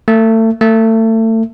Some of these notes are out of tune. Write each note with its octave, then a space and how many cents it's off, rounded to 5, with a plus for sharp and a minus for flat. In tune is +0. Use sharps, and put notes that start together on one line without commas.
A3 +30
A3 +30